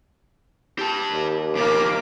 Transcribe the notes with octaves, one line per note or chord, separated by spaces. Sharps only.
G4 A5
D#2
F2 B2 A#3 D6